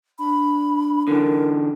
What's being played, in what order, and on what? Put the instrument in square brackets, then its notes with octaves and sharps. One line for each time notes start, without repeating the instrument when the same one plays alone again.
[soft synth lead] D4 [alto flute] B5
[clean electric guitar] D3 E3 [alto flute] A#4